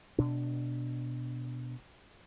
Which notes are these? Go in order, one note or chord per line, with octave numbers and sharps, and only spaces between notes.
B2 D4